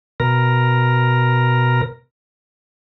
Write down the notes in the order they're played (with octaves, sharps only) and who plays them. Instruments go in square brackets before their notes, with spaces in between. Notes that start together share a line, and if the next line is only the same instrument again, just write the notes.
[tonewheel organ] B2 A#4